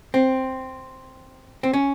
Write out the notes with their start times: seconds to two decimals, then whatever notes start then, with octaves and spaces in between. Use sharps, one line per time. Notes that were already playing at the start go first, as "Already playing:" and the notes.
0.14 C4
1.63 C4
1.73 C#4